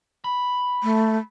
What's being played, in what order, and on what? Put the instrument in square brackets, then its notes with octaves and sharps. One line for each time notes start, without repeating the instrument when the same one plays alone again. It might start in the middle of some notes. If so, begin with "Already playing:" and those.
[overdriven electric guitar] B5
[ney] A3